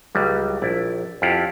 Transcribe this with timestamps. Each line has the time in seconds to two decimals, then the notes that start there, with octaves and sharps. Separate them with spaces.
0.15 C#2 F#3 G3
0.62 A#1 E4 D5
1.22 F2 E4 F4 G4 F#5